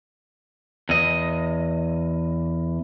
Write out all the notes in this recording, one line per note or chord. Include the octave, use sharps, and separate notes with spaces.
E2 D#5